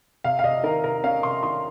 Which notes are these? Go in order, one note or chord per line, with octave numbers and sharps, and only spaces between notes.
C3 F5
F5
C3 D#5
D#3 A#4
C3 A#4
C#4 F5
C3 C6
D#3 C6